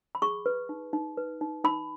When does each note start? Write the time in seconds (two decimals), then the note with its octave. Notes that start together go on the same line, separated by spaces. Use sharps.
0.15 B5
0.22 G#4 C#6
0.46 B4
0.69 D#4
0.93 D#4
1.17 B4
1.41 D#4
1.64 D#4 B5